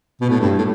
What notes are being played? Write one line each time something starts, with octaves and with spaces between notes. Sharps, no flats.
B2
A2
G2
A2